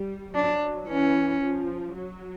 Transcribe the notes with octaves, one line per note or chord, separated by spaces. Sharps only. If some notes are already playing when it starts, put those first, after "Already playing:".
Already playing: G3
F#3 D4
E3 C#4
F3
F#3